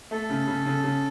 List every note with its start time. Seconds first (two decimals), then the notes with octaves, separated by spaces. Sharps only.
0.11 A3 A4
0.29 C#3
0.47 C#3
0.66 C#3
0.84 C#3